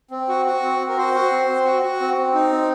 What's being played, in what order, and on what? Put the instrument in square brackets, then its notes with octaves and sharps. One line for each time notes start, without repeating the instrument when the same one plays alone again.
[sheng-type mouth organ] C4
F#4
F#4
C4
C4
A#4
F#4 C5
F#4
C4
C4
F#4
F#4
C4
C4
D#4
C4